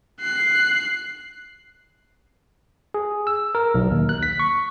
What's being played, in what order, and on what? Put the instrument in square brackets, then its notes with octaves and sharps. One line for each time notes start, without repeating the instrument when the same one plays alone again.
[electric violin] F#6 C7
[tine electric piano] G#4
E6
A#4
B1
D#2
F#6
B6
C#6